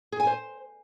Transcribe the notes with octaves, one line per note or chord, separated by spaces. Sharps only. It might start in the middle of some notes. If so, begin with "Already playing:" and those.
G#4
G#5
C5